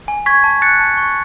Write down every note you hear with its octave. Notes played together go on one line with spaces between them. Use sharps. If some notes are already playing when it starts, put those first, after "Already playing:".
G#5
C#6 G#6 B6
A5
F#6 A6 C#7
A5
C#6